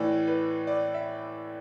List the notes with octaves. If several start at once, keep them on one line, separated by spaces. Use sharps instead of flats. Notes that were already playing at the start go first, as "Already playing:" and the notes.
Already playing: A2 E3 D5
B4
D5
E5